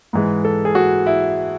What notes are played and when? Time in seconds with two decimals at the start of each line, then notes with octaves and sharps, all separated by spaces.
0.13 G#2 E3 G#3
0.45 A4
0.65 G#4
0.75 F#4
1.06 E4